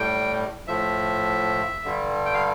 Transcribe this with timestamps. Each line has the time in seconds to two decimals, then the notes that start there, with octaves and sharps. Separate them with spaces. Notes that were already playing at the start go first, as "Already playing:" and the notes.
Already playing: A2 G3 G5
0.68 A2 F3 E5
1.84 G2 D3 G3
2.25 G5
2.34 F5